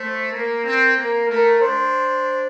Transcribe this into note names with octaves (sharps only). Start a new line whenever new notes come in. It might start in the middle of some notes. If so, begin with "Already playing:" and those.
Already playing: A3 C5
A#3 A#4
C4
A#3 A#4
A3 A#4
D4 C5